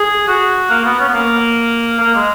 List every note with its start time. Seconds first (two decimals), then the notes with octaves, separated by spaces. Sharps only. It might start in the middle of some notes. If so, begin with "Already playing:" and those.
Already playing: G#4
0.28 F#4
0.70 A#3
0.84 B3
1.00 C#4
1.09 B3
1.14 A#3
2.00 A#3
2.15 G#3